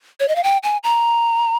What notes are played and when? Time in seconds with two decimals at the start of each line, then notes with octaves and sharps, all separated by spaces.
0.20 C#5
0.28 D#5
0.36 F5
0.44 G5
0.63 G#5
0.84 A#5